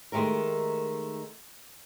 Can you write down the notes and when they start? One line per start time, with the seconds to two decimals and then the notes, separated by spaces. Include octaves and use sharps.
0.12 D#3 G#3 A3 G4 A#4